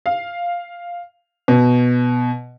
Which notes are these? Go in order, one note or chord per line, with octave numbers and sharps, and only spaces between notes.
F5
B2